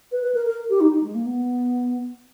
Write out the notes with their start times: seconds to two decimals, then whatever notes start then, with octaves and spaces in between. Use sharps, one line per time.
0.12 B4
0.23 B4
0.35 A#4
0.46 A#4
0.70 G4
0.81 D#4
0.92 D#4
1.04 G#3
1.15 A#3
1.26 B3